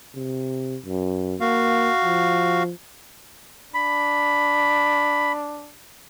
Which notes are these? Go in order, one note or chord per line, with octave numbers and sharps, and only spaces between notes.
C3
F#2
A#3 F#4 F5
F3
D4 B5